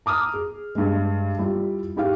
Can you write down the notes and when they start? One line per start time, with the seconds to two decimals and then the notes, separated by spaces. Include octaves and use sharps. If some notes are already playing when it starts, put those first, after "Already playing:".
0.06 A#5 D6 D#6 F6
0.34 G#4
0.75 G2 G#3
1.39 G3 E4 F4
1.96 G#2 E4 G4 F5